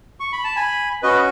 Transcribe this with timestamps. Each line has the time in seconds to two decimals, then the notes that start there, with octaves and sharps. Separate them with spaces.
0.20 C#6
0.32 B5
0.44 A5
0.56 G#5 B5
1.03 C#4 F#4 B4 D#5